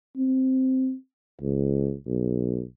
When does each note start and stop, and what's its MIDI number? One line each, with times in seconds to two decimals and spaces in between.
0.17 0.94 60
1.42 1.94 37
2.06 2.62 35